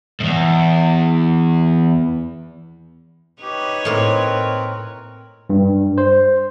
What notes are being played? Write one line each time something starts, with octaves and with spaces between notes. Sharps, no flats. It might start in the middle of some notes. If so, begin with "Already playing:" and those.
E2 G#2
D#4 G4 B4 C#5
A2 A#3 C4 A#4
G2
C5